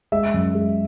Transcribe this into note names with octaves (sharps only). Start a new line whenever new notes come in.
G#3 E5
F#2
G#3